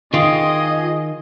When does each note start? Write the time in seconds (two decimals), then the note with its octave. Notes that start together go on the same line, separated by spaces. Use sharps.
0.14 D#3 F4 G#4 D#5 F5 G5